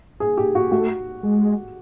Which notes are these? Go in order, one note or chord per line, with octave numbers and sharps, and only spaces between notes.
G#4
G4
F#4
A3 F#4
G#3